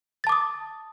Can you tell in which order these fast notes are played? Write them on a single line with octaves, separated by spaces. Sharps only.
A6 A5 D6 D#6